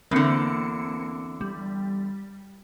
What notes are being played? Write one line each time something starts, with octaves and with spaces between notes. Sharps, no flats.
E2 D3 A#3 C4 C#7
G3